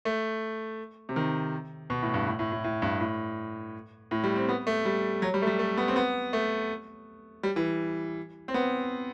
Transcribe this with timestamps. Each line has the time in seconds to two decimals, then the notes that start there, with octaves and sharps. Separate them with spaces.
0.05 A3
1.09 C3
1.16 D#3
1.90 B2
2.02 A2
2.14 G2
2.27 A2
2.39 A2
2.52 A2
2.64 A2
2.82 G2
3.01 A2
4.11 A2
4.24 G3
4.36 C4
4.49 B3
4.67 A3
4.85 G3
5.22 F#3
5.34 G3
5.42 A3
5.47 G3
5.59 A3
5.77 B3
5.88 C4
5.96 B3
6.33 A3
7.43 G3
7.56 E3
8.48 C4
8.54 B3